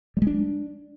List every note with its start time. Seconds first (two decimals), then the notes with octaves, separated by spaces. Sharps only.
0.17 G3
0.22 G#3
0.27 D4